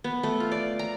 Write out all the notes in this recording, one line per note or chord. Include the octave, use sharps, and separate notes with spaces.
B3
A3
F4
D5
A#5